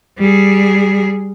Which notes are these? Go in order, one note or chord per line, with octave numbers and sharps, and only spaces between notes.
G3 G#4